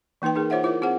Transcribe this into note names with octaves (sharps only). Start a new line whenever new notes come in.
E3 A#3 D#4 B4 G5
D#4 G#4 A#4
F4 C5 C#5 E5 F#5
E4 F4 A#4 E5 D6
C4 F4 G#4 C5 F#5